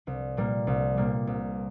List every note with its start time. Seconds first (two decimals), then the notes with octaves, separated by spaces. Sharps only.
0.07 C2
0.37 A#2 G3 A#3
0.67 C2
0.97 A#2 G3 A#3
1.27 C2